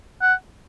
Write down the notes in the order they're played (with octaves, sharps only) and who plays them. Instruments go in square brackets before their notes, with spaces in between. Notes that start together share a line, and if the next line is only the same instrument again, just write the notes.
[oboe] F#5